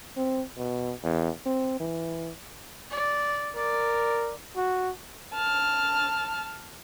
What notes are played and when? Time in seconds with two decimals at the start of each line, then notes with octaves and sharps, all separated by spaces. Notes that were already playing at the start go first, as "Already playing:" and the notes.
0.17 C4
0.57 B2
1.03 E2
1.46 C4
1.80 E3
2.91 D5
3.56 A#4 D5
4.56 F#4
5.34 A5 F6